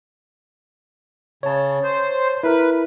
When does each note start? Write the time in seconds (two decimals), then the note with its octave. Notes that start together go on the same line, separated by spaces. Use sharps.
1.43 C#3 C#5 A5
1.84 C5
2.43 E4 A#4 B4